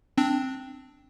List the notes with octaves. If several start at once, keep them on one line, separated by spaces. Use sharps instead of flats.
C4 D4